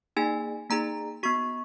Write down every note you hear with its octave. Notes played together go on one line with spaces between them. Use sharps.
A#3 D#4 G#4 G#5
A#3 D#4 G#4 A#5
B3 F#4 C#6